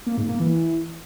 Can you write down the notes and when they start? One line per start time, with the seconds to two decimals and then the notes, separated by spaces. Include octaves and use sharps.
0.06 A#3
0.18 G#2
0.29 A#3
0.40 E3